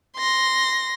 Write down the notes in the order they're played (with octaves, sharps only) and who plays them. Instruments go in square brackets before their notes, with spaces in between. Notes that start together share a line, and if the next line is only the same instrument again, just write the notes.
[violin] C6 A#6